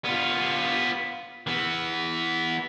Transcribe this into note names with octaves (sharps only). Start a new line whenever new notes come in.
B3 F4
E3 B3